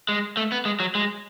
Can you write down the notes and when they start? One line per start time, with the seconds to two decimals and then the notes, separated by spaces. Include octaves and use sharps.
0.09 G#3
0.37 A3
0.52 B3
0.65 G#3
0.80 F#3
0.95 G#3